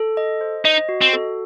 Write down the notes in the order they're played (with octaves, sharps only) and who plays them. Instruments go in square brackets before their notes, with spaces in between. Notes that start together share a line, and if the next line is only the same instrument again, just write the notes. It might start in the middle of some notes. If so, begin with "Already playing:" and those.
Already playing: [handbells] A4
D#5
C5
[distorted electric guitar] D#4 [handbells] D#5
[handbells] F#4
[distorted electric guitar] C4
[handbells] A4